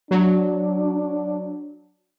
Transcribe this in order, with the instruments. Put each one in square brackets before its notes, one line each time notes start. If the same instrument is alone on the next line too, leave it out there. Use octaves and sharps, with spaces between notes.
[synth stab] F#3 [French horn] D4